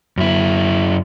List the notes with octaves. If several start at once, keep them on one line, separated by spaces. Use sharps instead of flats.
F#2 E4